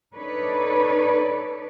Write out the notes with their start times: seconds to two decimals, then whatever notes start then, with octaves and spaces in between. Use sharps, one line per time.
0.15 D4 D#4 A4 B4 C#5 D5